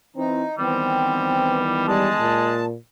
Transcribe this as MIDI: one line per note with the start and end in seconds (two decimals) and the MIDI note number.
0.16 0.43 52
0.16 0.43 60
0.16 0.56 63
0.58 2.23 51
0.58 2.23 52
0.58 1.85 55
0.58 2.23 59
0.58 1.58 60
1.88 2.08 55
1.88 2.63 56
1.88 2.65 81
2.20 2.76 46